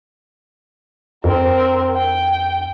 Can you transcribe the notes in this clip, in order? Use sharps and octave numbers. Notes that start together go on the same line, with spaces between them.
F2 C4 A#4
G5